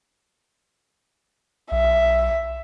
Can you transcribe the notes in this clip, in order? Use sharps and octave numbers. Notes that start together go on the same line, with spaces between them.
B1 E5